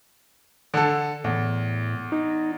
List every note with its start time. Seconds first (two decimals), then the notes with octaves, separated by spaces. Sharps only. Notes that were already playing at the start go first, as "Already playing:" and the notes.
0.74 D3 A4
1.24 E2 A2
2.12 D#4